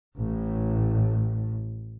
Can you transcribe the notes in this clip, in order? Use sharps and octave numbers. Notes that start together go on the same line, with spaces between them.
A1 A2